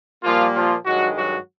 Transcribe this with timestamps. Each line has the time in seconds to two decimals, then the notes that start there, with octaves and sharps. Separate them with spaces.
0.23 A#2 F3 G3 A#3 F4
0.55 F3 F4
0.85 G2 D#3 F#3 G#3 F#4
1.16 F#3 F#4